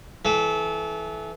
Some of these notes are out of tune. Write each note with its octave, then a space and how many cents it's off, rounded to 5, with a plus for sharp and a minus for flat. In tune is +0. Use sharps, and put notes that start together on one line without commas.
E3 +0 A4 -30